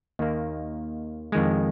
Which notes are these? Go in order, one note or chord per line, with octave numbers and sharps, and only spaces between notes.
D#2 D#3 A#3
F2 D#3 G#3